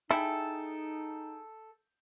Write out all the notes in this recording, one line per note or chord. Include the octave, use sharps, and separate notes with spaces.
D#4 E4 G#4 A4 G5